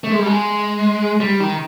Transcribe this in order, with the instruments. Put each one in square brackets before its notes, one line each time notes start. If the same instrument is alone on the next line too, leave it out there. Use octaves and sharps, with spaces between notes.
[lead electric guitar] A3
G#3
G3
G#3
G3
D#3